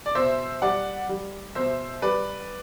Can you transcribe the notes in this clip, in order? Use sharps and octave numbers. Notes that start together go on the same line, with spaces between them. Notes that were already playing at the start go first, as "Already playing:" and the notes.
D5
B2 C5 E5
G3 D5 F#5
G3
B2 C5 E5
G3 B4 D5